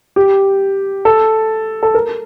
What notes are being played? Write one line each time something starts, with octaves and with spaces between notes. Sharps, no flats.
G4
A4
A4
A#4